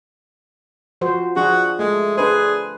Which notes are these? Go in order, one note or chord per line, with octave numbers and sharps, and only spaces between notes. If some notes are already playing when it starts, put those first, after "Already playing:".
F3 F#4 C5
F3 D4 F#4 G#4
G#3 A3
D4 G#4 B4 C5